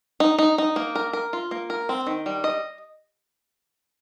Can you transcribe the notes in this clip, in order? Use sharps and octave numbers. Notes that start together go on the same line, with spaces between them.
D#4
D#4
D#4
A#3
A#4
A#4
F4
A#3
A#4
C4
D#3
G3
D#5